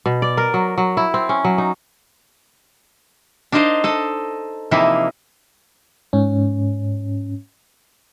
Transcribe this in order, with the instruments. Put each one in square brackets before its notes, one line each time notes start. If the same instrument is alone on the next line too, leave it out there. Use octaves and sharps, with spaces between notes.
[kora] B2
D5
A#4
F#3
F#3
E4
C4
C#4
F#3
D#4
[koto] D4 D#4 A#4 C5 D#5 F5
A4 D#5 A5
C3 E3 F3 A#3 D#4 E4
[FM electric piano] G#2 C#4